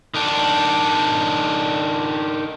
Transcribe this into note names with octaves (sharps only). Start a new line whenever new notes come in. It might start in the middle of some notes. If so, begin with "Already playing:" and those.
D#3 D4